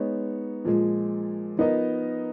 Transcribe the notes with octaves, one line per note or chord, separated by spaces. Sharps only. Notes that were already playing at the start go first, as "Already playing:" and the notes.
Already playing: G#3 B3 D#4 C#5
A#2 F3 G#3
F3 B3 D#4 A#4 D#5